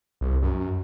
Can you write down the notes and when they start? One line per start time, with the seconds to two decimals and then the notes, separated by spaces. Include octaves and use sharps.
0.21 C2
0.43 F#2